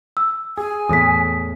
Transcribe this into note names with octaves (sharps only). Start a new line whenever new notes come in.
E6
G#4 G#5
E2 A2 D#6 B6